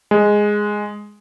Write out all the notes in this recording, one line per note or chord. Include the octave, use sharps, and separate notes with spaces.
G#3